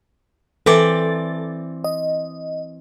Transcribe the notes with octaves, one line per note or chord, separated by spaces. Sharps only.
E3 C4 A4 D5
D#5